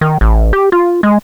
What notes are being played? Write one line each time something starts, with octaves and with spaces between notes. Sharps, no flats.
D#3
A1
G4
F4
G#3